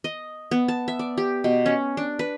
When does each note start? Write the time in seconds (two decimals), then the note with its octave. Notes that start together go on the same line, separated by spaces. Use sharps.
0.04 D#5
0.51 B3
0.68 A5
0.88 E5
0.99 D5
1.18 G4
1.44 B2
1.66 C#4
1.97 D4
2.19 B4